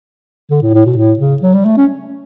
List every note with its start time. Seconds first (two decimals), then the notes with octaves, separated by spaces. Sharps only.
0.50 D3
0.62 A2
0.74 A2
0.86 B2
0.96 A2
1.19 C#3
1.42 F#3
1.54 G3
1.65 A3
1.77 C#4